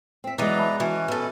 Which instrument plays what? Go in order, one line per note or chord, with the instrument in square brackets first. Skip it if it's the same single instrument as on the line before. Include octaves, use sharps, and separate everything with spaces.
[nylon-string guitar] C4 E5
[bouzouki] E3 F#3 [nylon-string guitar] G#3 B3 [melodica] D5 A#5
[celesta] E5 A5 B5
[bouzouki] E3 [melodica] C#4 [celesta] F#4
[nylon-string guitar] B2 [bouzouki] A4 B4